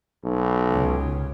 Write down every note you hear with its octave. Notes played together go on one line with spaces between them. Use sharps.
B1
C#2 C#3